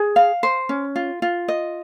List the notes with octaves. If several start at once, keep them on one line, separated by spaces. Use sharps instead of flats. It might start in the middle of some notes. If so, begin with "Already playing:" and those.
Already playing: G#4
F5
C5
C#4
F4
F4
D#5